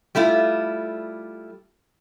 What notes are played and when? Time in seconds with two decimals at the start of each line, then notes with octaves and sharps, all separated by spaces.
0.15 G3 A3 E4 F4